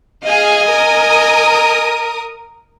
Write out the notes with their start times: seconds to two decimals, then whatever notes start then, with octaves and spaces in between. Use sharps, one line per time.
0.24 G#4 D#5 F5 G#5
0.69 A#4 D#6